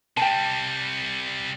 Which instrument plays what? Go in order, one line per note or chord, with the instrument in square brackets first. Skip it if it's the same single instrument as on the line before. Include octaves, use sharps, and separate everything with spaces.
[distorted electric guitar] C3 G3 [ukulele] G5 A5